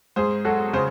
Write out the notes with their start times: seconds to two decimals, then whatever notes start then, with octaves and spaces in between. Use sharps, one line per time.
0.16 G#2 G#4 C5
0.45 F#3 F#4 A4
0.73 C#3 G#4 C5